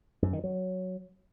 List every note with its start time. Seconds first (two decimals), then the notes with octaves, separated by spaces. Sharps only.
0.22 F#2
0.33 D#3
0.44 F#3